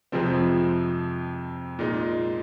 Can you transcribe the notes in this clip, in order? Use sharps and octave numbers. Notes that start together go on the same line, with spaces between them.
F2 C3 F3 G#3 C4
A#2 G#3 D#4